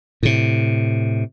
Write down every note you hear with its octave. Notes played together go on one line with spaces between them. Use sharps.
A2 C3